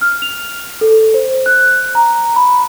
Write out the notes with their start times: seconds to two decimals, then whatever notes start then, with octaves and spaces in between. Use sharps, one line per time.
0.01 F6
0.22 F7
0.81 A4
1.14 C5
1.46 F#6
1.95 A#5
2.36 B5